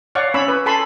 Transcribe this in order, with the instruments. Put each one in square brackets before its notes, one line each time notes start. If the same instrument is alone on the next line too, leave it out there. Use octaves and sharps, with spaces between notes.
[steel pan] C#5 D5 F5 F#5 C#6
C#4 C#5 B5 E6
B4
A4 G#5 A5 B5 C6